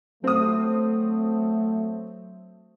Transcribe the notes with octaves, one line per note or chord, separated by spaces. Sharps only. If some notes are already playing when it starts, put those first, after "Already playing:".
F#3 A3 C4 D#6